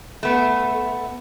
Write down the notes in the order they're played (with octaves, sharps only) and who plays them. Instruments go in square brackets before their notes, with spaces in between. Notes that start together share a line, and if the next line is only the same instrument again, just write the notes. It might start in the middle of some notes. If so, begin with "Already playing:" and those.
[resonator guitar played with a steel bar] A3 B3